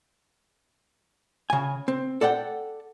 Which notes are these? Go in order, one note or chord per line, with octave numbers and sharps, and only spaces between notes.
C#3 G#5
C4
A4 D5 F#5 G5